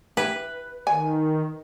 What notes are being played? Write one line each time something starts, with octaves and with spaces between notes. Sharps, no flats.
E4 G4 B4
D#3 G#5